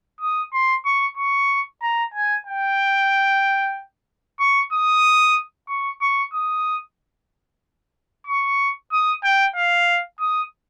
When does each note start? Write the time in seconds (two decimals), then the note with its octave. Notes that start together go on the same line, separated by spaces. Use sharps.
0.21 D#6
0.53 C6
0.85 C#6
1.17 C#6
1.82 A#5
2.14 G#5
2.47 G5
4.40 C#6
4.72 D#6
5.69 C#6
6.02 C#6
6.33 D#6
8.27 C#6
8.92 D#6
9.24 G5
9.56 F5
10.20 D#6